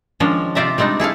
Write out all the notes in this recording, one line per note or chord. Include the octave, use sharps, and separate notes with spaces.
D#3 F3 G#3 C#4 D4
C3 F4 C5 D5 E5 A#5
G3 G#3 C4 D4 D#4
E4 G#4 A4 F5